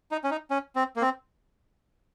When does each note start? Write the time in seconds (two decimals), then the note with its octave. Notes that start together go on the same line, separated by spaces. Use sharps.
0.11 D#4
0.24 C#4
0.31 D#4
0.50 C#4
0.76 C4
0.96 A#3
1.02 C4